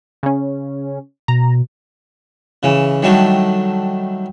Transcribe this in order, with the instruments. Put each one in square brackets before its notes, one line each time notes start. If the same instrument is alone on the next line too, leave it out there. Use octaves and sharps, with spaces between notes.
[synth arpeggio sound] C#3 C#4
[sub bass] B2 [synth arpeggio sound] A#5
[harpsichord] C#3 E3
D#3 F#3 G3 A3 D4